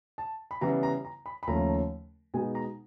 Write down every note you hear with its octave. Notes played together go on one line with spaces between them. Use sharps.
A5
B5
C#3 E3 G3 B3 E4 A#5
A#5
A#5
B5
B5
D#2 C#3 F3 A3 C#4 A#5
B2 G#3 B3 D#4 G#5
A#5